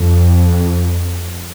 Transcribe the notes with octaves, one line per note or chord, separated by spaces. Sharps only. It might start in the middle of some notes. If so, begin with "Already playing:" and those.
Already playing: F2